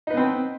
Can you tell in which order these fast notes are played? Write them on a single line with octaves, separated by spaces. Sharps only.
D#4 B4 B3 C4